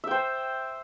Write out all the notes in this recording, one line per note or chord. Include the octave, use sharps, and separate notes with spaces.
C5 E5 G5